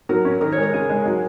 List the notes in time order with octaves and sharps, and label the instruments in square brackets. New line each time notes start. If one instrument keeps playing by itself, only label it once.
[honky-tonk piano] F#3 [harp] A#4
[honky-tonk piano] C#4
[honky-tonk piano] D#3 [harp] A#4
[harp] C#5
[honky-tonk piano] G#3 [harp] A#4
[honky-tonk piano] C#3 [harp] G#4
[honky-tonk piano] G#3
F#3